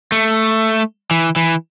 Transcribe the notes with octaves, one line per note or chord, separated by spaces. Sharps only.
A3
E3
E3